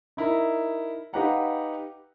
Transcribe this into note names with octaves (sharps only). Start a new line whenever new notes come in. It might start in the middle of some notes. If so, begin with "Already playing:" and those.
D#4 E4 A#4
D#4 G4 B4 F5 F#5 A#5